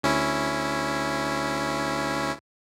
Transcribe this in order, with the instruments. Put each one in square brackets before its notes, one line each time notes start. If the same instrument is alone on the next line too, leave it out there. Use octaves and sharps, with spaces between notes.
[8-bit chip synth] D2 C#4 E4